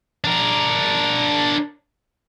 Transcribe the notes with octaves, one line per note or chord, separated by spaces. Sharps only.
D4 A#4